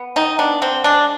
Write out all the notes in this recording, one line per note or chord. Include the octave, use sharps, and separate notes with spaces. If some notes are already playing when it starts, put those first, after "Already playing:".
Already playing: B3
D#3 D#4
B3 D4
D3 C4
G#3 D4